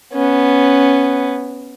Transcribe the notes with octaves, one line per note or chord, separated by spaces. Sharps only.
B3 C#4